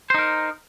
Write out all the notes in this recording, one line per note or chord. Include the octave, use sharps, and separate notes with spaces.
D#4 A#4 C5